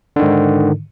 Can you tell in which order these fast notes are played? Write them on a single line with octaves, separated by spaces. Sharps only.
D3 D#3 G#2